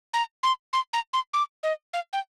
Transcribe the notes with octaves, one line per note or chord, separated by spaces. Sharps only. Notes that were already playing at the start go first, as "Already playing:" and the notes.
A#5
C6
C6
A#5
C6
D6
D#5
F5
G5